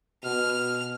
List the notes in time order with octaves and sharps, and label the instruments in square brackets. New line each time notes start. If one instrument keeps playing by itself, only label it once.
[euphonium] B2 [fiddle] F6